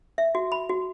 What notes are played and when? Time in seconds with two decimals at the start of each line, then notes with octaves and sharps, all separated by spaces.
0.18 E5
0.35 F#4
0.52 B5
0.69 F#4